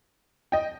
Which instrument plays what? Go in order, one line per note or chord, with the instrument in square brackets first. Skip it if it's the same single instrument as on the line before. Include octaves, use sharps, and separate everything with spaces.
[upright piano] D#5 G5